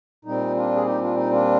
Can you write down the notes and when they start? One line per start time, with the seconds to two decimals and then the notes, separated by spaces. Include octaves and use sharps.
0.25 A#2 G3 C4 D#4
0.55 D4 F4
0.76 G#4
0.86 D#4 G4
1.01 D4 F4
1.17 D#4
1.32 D4 F4